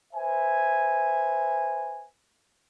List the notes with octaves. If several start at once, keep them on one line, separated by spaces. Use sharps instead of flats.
B4 C5 E5 G#5